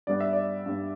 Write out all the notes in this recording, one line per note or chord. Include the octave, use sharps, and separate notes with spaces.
G2 G3 B3 D5
E5
D5
G2 G3 B3